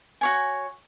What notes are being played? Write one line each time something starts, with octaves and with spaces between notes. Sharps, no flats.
F#4 C#5 G#5